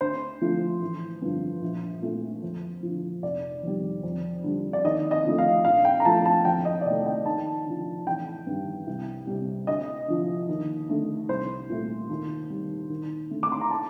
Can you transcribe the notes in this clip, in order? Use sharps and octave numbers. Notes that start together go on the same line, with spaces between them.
D2 C5
D3 F3 A3
A1
G2 D3 F3
A#1
A#2 A3
F2
D3 F3
F1 D5
F2 D#3 G3
F2
D3 G3
D5
D#2 D#5
D#5
D3 F3 A3
F5
A#1 F5
G5
A#5
A2 F3 A3 A5
A5
F2 G5
D#5
D5
C3 D#3 A3 D#5
G5
D#2 A5
D3 F3
A1 G5
G2 D#3 G3
C2
C3 G3
D2 D#5
D3 F3
D#2
D3 A3
C2 C5
A#2 A3
D#2
D#3 G3
D#2
D3 A3
D6
C6
A#5
A5